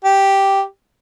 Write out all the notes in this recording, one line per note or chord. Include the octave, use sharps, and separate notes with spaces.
G4